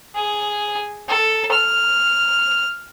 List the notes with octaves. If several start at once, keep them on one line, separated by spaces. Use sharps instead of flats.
G#4
A4
F6